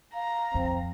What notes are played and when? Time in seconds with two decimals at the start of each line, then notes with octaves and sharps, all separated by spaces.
0.14 F5 A#5
0.54 F2 C4